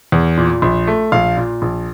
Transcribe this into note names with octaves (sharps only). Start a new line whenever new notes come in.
E2
A#2
A#1
A3
A#1 F5
A#2
A#1